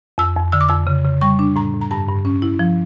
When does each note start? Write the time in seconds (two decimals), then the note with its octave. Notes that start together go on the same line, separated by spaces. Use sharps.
0.18 F2 E6
0.36 F2
0.52 D3 E6
0.61 D6
0.69 F2 E6
0.87 C#3
1.05 C#3
1.21 G3 C#6
1.39 D4
1.56 A2 A#5
1.74 A2
1.81 A#5
1.91 G2 A5
2.08 G2
2.25 C#4
2.42 E4
2.59 F3